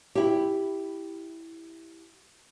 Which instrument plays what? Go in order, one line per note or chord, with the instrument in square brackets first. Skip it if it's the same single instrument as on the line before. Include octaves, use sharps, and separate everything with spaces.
[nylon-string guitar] E4 G4